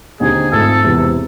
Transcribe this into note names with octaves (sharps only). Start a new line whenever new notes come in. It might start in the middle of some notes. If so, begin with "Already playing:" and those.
D#2 D3 G3 C4 D#4 G#4
G#1 G#2 F3 A3 A4
E1 E2 C3 E3